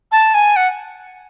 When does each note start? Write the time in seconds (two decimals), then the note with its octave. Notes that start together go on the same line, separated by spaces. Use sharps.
0.12 A5
0.34 G#5
0.56 F#5